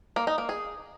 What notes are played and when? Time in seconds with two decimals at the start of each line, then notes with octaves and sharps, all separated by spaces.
0.16 A#3
0.27 D#4
0.38 A#3
0.49 G#4